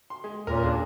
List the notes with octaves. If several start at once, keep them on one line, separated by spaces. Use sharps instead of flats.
C6
G#3
D#2 A#2 C#4 A#4
D#2 D4 G#4